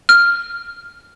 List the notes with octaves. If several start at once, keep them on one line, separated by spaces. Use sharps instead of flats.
F6